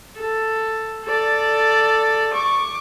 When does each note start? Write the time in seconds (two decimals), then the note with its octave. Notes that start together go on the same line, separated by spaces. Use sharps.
0.17 A4
1.05 A4 D5
2.34 C#6 D6